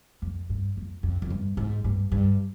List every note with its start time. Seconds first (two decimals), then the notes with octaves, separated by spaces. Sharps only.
0.22 F2
0.49 G2
0.77 F2
1.03 F2
1.22 F2
1.30 G2
1.57 G#2
1.84 G2
2.12 G2